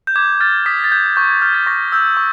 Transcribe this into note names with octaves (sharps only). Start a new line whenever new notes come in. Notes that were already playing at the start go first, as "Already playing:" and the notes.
G6
D6 G#6
F6 A6
D#6 B6
A6
G6 G#6
G#6
C#6 G6
G#6
F6 G6
A6
C#6 A#6
E6 G6
C#6